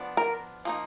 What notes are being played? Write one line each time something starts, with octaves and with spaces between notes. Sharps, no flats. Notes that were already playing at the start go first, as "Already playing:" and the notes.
Already playing: F3 B3 D4
A#4
F3 A#3 D#4